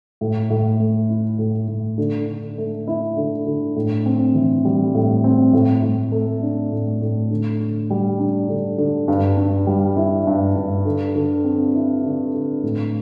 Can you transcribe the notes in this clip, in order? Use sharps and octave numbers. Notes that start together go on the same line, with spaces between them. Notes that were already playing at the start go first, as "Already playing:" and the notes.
A2
A2
A3
E4
A2
A2
D3
D3
A3
E4
D3
D3
A2
C4
E3
G3
A2
C4
A2
A2
A3
D4
A2
A2
D3
D3
G3
D4
D3
D3
G2
G2
G3
E4
G2
G2
D3
D3
C4
E4
D3
D3
A2